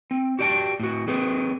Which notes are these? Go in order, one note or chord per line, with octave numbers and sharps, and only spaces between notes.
C4
F#4 G4 D5 G5 A5
A2 F#4
C4 G#4 A4 B4